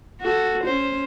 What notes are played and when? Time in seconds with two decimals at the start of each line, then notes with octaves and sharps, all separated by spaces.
0.21 F#4 A4
0.63 C#4 C5